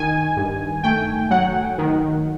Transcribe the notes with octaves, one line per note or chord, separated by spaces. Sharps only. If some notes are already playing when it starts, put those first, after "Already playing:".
Already playing: D#3 G#5
G2
A3 G5
F#3 F#5
D#3